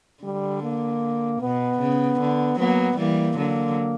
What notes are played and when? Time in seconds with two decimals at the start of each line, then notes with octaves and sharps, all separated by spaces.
0.23 D3 G3
0.63 A#3
1.41 B2 B3
1.80 C#3
2.20 D3
2.59 F#3 A#3 B3
2.98 E3 G3 A#3
3.38 D3 F#3 A#3